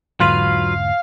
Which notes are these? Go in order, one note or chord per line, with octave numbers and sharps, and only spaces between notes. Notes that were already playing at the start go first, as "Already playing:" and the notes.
E1 G#2 D3 F#3 F4 B4 F5 C6